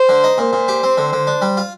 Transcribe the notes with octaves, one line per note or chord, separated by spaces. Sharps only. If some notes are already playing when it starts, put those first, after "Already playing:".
Already playing: C5
D3
D#4
A#2 C5
A#2
G4
C4
D3
D3
D4
G3
F4